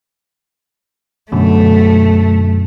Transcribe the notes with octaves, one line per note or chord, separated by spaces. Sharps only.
F#2 B2 D3 A3